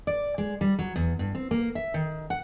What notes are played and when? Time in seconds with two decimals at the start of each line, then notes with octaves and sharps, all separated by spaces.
0.07 D5
0.38 G#3
0.61 G3
0.79 F#3
0.96 E2
1.19 G2
1.35 C4
1.51 A#3
1.75 E5
1.94 D#3
2.30 F#5